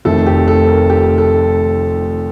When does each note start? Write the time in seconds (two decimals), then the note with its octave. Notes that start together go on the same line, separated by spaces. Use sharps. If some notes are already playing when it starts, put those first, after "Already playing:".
0.05 F1 F2 D#3 A3 C4 A4
0.26 G4
0.48 A4
0.68 A#4
0.90 G4
1.18 A4